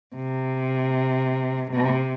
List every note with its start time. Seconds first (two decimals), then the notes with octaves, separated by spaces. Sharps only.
0.16 C3
1.70 C3